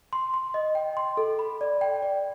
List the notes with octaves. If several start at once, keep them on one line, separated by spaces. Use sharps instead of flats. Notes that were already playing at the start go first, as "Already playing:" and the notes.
C6
C6
D#5
G5
C6
A4
B5
D5
G5
D5